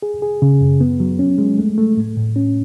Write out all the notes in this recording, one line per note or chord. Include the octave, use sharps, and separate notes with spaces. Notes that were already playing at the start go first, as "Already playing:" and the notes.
G#4
G#4
C#3
F#2
B3
F#3
C#4
G#3
A3
A3
A2
A2
C#4